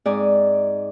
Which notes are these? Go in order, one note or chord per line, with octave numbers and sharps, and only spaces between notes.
G#2 C4 G#4 D5 D#5 G#5